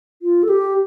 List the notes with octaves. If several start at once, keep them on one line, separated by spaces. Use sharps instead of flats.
F4
A4
G4